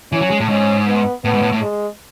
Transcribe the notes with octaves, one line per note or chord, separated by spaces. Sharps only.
E3 C#4
F#3
G#3
A2
G#2 C#4
B3
A2 B3
G#2
A2
A2
G#3